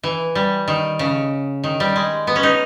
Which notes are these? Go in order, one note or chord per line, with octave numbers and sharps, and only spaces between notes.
E3
G3
D#3
C#3
D#3
G3
G#3
B3
C#4
D#4